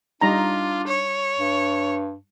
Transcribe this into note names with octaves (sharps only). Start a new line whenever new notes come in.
G3 D4 D#4 F4 A#5
C#5
G2